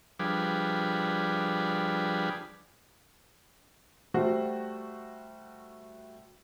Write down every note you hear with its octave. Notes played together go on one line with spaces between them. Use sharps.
F3 G3 D4 G#4 B4
G3 A3 F#4 C5